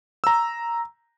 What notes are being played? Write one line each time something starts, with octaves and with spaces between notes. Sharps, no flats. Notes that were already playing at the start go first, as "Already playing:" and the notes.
A#5 E6